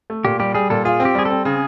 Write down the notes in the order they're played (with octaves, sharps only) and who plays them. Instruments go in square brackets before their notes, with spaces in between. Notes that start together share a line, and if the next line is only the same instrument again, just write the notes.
[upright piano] A3
[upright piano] A#2 [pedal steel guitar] G4
[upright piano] G3 [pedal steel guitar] G4
[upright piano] G3 [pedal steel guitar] G#4
[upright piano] A#2 [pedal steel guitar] A4
[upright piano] F4 [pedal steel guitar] G#4
[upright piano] C4
[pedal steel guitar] G4
[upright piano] G3 [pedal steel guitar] G#4
[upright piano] C4 [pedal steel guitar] A4
[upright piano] C#3 [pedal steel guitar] G#4